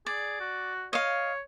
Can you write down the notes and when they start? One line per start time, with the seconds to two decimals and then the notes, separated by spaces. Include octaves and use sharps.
0.06 G#4 D5
0.41 F#4
0.93 C#5 D#5 F5